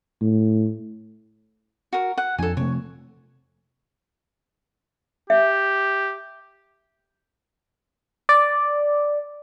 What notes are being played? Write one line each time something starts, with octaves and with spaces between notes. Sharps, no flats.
A2
F#4 A#4
F#5
F2 F3 D4 A4 G#5
C3 F3 A3 C#5
G4 E5
D5